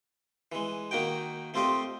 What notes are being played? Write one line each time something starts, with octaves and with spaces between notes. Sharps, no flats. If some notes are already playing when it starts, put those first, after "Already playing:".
E3 G#3
D#3 A#3 D#4 F#4 G5
A3 C4 F4 G4 D#5